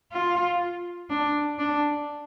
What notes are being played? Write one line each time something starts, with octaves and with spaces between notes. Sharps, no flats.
F4
D4
D4